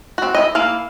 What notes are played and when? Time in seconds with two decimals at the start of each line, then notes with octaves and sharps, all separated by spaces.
0.18 C4 F#4
0.35 E4 D#5
0.55 A#3 E4 F5